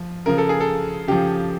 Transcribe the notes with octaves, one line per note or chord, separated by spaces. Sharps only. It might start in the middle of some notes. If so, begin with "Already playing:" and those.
Already playing: F3
C#3 F3 A#4
A4
G#4
A4
C#3 F3 G4